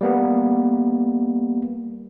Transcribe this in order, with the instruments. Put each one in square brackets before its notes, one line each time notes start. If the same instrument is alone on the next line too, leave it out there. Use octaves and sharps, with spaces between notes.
[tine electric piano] G3 A#3 B3